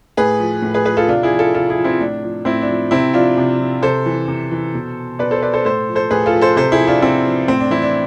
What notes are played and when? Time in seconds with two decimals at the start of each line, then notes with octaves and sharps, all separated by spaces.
0.17 A2 G#4 B4
0.39 F3
0.62 A2
0.74 G#4 B4
0.85 F3 G#4 B4
0.97 F4 A4
1.08 C3 D4 F4
1.23 E4 G#4
1.31 F3
1.39 F4 A4
1.54 C3 F4 A4
1.70 E4 G#4
1.77 F3
1.84 C4 E4
2.00 A2 D4
2.23 F3
2.45 A2 C4 E4
2.61 D4
2.68 F3
2.91 C3 C4 E4
3.14 F3 D4 F4
3.38 C3
3.60 F3
3.82 C3 A4 C5
4.06 E3
4.28 C3
4.51 E3
4.75 B2
5.19 B2 B4 D5
5.31 A4 C5
5.42 B4 D5
5.53 A4 C5
5.65 A2 A4 C5
5.89 F3
5.95 A4 C5
6.11 A2 G#4 B4
6.26 F4 A4
6.34 F3
6.41 A4 C5
6.56 C3 A4 C5
6.72 E4 G#4
6.79 F3
6.87 D4 F4
7.02 C3 C4 E4
7.25 F3
7.48 A2 C4
7.60 D4
7.71 E3 C4 E4
7.82 D4